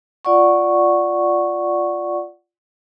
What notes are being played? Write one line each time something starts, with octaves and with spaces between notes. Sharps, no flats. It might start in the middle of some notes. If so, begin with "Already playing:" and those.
F4 D5 F#5 C#6